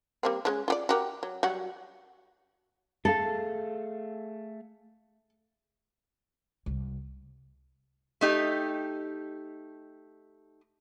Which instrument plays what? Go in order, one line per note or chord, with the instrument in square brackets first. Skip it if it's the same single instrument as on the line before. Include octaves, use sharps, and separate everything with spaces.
[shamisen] G3 A#3 C4
F3 G#3 C#4
F4 G4 D5
F#4 G4 A#4
F#3
F#3 G3 F#4
[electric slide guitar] A3 G#4 F5 [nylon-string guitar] A4
[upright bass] C2
[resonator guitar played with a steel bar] A3 D#4 G4